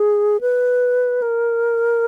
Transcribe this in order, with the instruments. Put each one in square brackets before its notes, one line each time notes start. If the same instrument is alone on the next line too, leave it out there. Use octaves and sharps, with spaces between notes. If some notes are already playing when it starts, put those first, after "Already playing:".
Already playing: [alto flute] G#4
B4
A#4